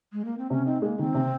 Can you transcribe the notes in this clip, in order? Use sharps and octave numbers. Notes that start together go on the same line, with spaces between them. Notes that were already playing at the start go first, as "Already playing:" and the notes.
G#3
A#3
C4
C3 C#4
C4 D#4
G#3 A#3
D#3 C4
C3